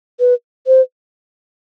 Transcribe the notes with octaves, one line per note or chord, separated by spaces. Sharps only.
B4
C5